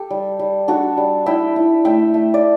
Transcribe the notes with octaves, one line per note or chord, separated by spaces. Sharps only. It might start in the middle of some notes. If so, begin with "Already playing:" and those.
Already playing: G4 A4
G3
G3
D4 F#4 A4
G3
E4 E5 G5
E4
A3 E5 G5
A3
D5